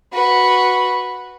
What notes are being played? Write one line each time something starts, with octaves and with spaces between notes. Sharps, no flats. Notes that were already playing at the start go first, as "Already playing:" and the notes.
F#4 B4